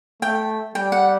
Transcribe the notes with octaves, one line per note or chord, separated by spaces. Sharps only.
A3 G5
G3 G5
F#5